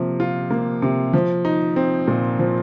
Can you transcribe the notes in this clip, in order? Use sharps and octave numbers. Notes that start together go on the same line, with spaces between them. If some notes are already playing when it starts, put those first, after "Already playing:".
Already playing: C3 F3 A#3
F4
A#3
C3
F3
D#4
C4
A#2
F3